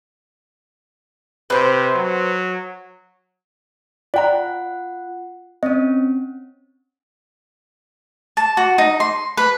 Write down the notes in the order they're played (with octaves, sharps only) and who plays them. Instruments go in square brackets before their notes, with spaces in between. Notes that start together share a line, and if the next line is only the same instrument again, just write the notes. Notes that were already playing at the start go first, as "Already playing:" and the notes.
[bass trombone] C3 [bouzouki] B4 C5
[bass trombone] F#3
[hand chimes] F4 F#5 [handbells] D5 G5 A#5
[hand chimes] C4 C#4 [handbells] D#5
[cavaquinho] A5
F#4
D#4
C6
B4